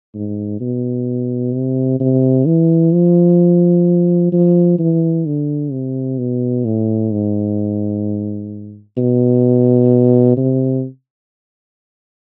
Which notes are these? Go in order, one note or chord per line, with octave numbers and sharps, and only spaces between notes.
G#2
B2
C3
C3
E3
F3
F3
E3
D3
C3
B2
A2
G#2
B2
C3